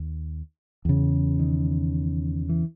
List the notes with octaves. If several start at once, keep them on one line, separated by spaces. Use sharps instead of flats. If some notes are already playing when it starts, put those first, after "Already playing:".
Already playing: D#2
E2 C#3
D#3
E3